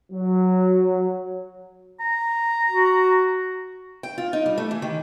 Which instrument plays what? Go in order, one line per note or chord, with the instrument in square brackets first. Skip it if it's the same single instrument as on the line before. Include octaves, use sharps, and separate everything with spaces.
[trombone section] F#3
[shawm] A#5
[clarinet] F#4
[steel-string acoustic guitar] G5
F4
D#4
G3
A3
E3
D#3